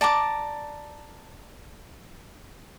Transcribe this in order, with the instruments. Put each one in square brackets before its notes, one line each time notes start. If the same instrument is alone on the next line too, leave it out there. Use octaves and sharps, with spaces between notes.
[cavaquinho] D5 A5 A#5 D6